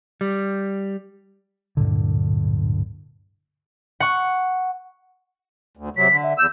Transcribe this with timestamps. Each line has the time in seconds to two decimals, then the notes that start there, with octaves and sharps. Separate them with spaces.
0.21 G3
1.77 D1 G2 A#2 D3
4.00 F#5 C#6
5.77 D2
5.96 C3 F#3 B6
6.10 D3
6.23 E5
6.38 E2 E6 G6